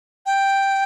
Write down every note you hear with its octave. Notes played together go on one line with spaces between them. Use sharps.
G5